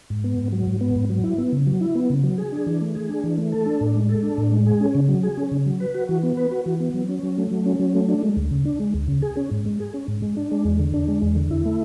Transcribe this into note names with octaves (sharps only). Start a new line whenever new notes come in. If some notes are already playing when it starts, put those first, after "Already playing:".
G#2
B3
G#2
F#3
G#2
B3
G#2
F#3
E4
B3
C#3
F#3
E4
B3
C#3
F#3
G#4
D4
E3
A3
G#4
D4
E3
A3
A4
D4
A2
G#3
A4
D4
A2
G#3
G#4
C#4
C#3
F#3
G#4
C#4
C#3
F#3
B4
F#4
E3
B3
B4
F#4
E3
B3
F#3
C#4
F#3
A3
F#3
C#4
F#3
A3
D4
G#3
D2
C#3
D4
G#3
D2
C#3
G#4
C#4
G#2
G#3
G#4
C#4
G#2
G#3
D4
G#3
E2
D3
D4
G#3
E2
D3
E4
A3